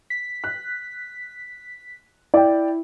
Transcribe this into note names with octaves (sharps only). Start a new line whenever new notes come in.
B6
F#6
E4 D5 G5